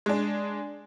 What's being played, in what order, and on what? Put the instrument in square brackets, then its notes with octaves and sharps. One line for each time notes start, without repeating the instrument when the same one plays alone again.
[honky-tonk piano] G#3 D4